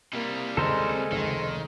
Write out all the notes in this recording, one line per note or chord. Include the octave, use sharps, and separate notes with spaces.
C3 G3 A#3
D#2 C#3 G#3 C4 A4 A#4 C5
F1 C#2 D#3